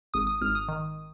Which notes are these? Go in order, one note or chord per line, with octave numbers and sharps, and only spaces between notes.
G#1 D#6
D#6
G#1 F6
D#6
D#3